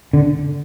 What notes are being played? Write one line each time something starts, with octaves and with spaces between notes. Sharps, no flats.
D3